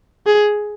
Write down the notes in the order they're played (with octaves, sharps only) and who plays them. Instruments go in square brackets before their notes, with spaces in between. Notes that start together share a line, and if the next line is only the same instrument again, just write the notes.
[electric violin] G#4